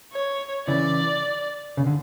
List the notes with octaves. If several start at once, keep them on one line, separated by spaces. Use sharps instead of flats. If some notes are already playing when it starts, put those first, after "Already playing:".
C#5
C#3 E3 D5
C#3
D3